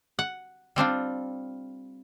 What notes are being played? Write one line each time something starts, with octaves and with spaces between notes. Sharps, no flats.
F#5
G3 C4 D4 F4